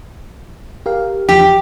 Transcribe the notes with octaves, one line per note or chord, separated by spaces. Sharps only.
G4 A#4 F5
E2 F3 G4